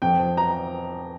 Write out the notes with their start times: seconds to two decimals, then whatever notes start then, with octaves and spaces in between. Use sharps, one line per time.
0.02 F2 G5
0.19 F3
0.37 A#5